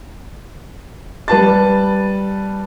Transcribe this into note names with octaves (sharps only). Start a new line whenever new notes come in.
G3 B4 A5 A6